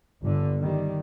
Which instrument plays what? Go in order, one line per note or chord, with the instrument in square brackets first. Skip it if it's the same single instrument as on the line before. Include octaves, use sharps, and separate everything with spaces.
[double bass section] G1 D3
D#3 G3